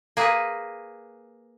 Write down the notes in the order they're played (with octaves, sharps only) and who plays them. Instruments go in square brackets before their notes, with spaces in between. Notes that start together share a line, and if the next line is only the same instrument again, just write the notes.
[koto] A#3 G#4 B4